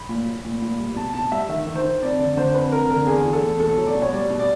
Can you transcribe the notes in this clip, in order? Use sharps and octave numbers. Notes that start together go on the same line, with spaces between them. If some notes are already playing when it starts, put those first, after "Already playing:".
Already playing: B5
A#2
F#3
A#2
A#2
G3
B2 A5
B2 A5
G3 E5
D#3 E5
D#3
C5
D#3
F2 D5
D3 D5
D3 C5
F2 B4
F2 A#4
D3 A#4
E2 G#4
E3
A4
E2
B2 A4
F#3
D5
B2
C#5
G3 D5
B2
D5